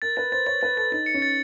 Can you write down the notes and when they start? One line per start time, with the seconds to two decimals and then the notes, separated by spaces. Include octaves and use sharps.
0.02 A#4 A6
0.17 B4 A6
0.32 C5 A6
0.47 C#5 A6
0.61 B4 A6
0.77 A4 A6
0.92 D#4 A6
1.06 C#7
1.14 C#4
1.22 A6